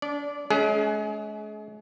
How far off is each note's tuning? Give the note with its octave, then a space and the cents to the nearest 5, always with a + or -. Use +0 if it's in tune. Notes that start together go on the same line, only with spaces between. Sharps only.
D4 -30 D5 -10
G#3 +40 C#4 +30 G#4 +20